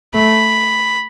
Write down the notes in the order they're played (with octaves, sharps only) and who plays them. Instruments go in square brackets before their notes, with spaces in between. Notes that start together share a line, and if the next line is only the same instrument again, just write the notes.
[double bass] A3 [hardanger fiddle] B5